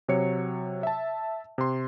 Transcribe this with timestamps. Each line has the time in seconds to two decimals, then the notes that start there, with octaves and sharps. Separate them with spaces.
0.08 C3 F#3 C#5 C#7
0.83 E5 A5
1.58 C3 C6